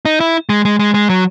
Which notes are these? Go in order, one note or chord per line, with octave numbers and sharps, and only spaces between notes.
D#4
E4
G#3
G#3
G#3
G#3
F#3